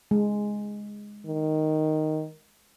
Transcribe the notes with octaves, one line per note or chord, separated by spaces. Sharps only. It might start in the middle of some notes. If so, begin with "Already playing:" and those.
G#3
D#3